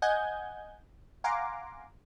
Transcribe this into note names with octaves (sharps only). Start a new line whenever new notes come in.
D#5 F#5 G#5 G6 G#6
F5 F#5 G#5 A#5 C6 D6